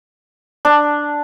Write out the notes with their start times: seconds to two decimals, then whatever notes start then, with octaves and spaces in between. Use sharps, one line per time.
0.65 D4